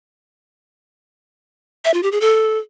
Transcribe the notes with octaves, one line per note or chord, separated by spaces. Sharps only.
E5
F4
G4
G#4
A4